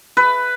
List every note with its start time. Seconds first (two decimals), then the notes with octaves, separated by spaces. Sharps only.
0.17 B4